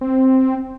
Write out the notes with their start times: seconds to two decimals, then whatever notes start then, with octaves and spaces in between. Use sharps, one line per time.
0.01 C4